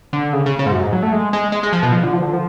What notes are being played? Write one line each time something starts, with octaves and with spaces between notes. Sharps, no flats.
D3
C#3
C#3
C#3
G#2
F#2
G#2
F#3
A3
G#3
G#3
G#3
G#3
F3
B2
F3
D3
F3
D3
F3